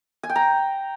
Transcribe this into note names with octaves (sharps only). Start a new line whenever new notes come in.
G#5
G5
A#5